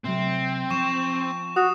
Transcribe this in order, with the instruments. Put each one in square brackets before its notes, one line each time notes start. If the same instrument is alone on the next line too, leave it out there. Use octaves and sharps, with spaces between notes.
[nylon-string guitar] C3 F#3 A3 [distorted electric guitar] C4
[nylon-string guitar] F3 [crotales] C#6 E7
[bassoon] F#4 [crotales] D#6